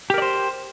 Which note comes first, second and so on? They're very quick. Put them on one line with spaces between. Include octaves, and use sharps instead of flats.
G4 A#4 D5 C5